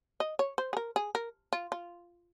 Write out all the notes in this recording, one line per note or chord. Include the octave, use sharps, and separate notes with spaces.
D#5
C#5
C5
G#4
A#4
G#4
A#4
F4
F4